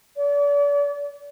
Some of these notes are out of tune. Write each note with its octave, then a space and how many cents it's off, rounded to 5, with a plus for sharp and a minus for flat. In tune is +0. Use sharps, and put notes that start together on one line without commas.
D5 -40